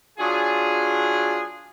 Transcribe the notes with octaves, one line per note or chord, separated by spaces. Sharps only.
F#3 D4 F4 G#4